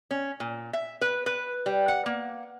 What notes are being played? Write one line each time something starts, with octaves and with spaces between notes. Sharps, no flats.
C#4
A#2
E5
B4
B4
G3
F#5
A#3